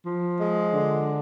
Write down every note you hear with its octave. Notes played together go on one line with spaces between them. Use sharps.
F3
G#3
D3